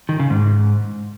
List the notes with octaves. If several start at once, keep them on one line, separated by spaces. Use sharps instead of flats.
D#3
C#3
G#2